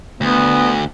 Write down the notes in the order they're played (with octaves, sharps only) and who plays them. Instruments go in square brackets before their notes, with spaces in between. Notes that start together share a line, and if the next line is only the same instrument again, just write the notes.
[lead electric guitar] D2 [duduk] B3